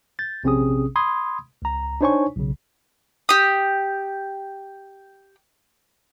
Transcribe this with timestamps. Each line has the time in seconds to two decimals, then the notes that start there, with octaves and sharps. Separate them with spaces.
0.19 G6 A6
0.44 A#1 C3 C4 C#4 G#4 D#6
0.96 B5 C6 D#6 G#6
1.62 C#2 A#5
2.01 D4 D#4 C5 C#5 G#5 C#6
2.36 B1 C#3
3.29 G4 D#6